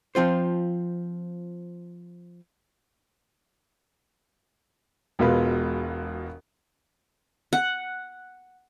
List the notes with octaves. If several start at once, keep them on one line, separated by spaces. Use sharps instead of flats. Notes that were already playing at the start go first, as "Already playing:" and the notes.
F3 C4 F4 C5
E1 B2 G#3 F4 B4
F#5